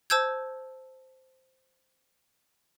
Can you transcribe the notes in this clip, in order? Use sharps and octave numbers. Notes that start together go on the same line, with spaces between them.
C5 A5 E6 G6 G#6